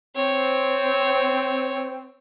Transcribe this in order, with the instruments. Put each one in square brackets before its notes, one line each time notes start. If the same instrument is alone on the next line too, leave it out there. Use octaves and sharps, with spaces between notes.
[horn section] C4 [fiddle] C#5